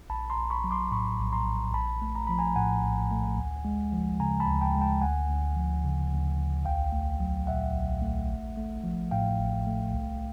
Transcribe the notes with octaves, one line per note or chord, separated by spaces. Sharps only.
A#1 A5 B5
A#5 C6
A#1
B5 C#6
F#3
C6 D6
A2 B5 C#6
A#1
A#5 C6
A#1
A#1 A5 B5
A3
A#5
F3 B5
G#5 A#5
A2 F#5 G#5
A#1
A3
D2
G#3
F3
C#3 G#5 A#5
A5 B5
D2
G5 A5
G#3
G5 A5
D2 F#5 G#5
D2
F3
C#3
D2
D2
B1 F5 G5
A3
F#3
A#2 E5 F#5
B1
A3
A1
A3
F3
A2 F5 G5
A1
A3
C2